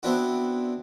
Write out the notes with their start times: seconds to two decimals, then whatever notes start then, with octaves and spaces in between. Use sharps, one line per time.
0.03 B3 C4 D4 E4 F#4